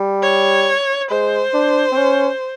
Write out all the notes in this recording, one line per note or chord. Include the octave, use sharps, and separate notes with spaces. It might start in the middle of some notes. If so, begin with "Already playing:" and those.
Already playing: G3
C#5
G#3 C5
D4
C4
C#4